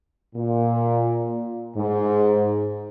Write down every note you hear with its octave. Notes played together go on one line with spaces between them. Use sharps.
A#2
G#2